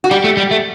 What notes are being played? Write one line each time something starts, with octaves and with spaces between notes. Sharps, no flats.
F#4
G3 G4
A3
G3
A3